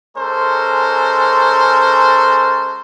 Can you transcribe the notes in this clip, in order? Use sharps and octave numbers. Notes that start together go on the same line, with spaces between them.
G#3 C#4 A4 A#4 C5